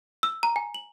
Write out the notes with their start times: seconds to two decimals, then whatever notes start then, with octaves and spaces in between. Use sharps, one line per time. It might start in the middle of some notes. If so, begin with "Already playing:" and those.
0.23 E6
0.43 A#5
0.56 G#5
0.74 F#7